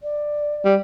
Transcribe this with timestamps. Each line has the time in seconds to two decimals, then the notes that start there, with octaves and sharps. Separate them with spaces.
0.03 D5
0.65 G3